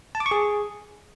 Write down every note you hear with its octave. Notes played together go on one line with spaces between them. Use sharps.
A5
D6
C#6
G#4